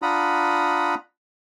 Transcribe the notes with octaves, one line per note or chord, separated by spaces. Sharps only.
D4 F4 F#5 A#5 B5 D#6